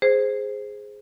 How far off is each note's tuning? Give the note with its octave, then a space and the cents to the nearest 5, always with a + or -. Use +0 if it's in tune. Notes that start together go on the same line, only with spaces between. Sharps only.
G#4 +0 C5 +0